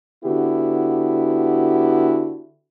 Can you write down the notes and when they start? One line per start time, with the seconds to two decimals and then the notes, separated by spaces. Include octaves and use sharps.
0.25 D3 B3 E4 F#4 G4